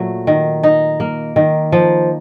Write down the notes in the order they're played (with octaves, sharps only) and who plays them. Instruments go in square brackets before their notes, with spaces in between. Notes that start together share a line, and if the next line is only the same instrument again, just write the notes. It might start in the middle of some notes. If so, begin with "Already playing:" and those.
Already playing: [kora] A#2 F#3 A3
D#3
D#4
A#3
D#3
F3